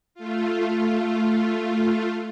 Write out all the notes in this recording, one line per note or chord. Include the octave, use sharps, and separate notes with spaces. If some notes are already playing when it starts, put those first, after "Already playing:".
A3 F4